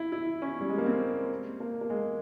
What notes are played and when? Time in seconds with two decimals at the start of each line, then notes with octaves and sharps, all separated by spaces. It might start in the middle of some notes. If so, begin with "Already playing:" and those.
Already playing: E4
0.12 E4
0.42 C#4
0.61 G3
0.69 G#3
0.78 A#3
0.86 C4
1.60 A#3
1.81 A#3
1.90 G#3